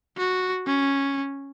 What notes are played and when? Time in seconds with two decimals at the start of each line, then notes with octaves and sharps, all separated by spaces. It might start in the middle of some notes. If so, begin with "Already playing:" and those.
0.17 F#4
0.66 C#4